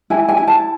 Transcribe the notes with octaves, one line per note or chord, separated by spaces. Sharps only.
E4 G#5
G#5
E4
A5